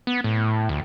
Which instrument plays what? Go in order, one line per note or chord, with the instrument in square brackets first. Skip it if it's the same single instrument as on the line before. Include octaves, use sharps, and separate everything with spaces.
[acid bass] B3
A2
D2